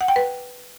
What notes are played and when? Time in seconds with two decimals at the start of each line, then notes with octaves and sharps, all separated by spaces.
0.01 F#5
0.08 G5
0.16 B4